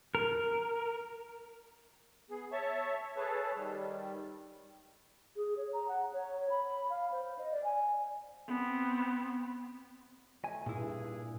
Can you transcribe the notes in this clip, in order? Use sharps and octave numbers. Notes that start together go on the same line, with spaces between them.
A#4
B3 G#4
C#5 E5 A5 C#6
G#4 A4 B4 C#5 A5
D#3 G3
G#4
C#5
A#5
F#5
C#5
B5
F5
C5
D#5
D5
G#5
B3 C4
A3 G#5
G2 A#2 E4 G#4